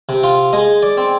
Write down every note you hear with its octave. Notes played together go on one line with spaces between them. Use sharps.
C3
F4
G#3 D#5
D5
C4